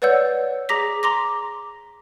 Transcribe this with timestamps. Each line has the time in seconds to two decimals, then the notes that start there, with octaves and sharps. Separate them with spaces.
0.02 B4 C#5 D5 F#5 E6 G6
0.69 G#4 A#5 D6 A#6 B6
1.03 A#5 C6 D6 A#6